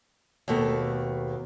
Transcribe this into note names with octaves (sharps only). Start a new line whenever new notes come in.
D#2 B2 A3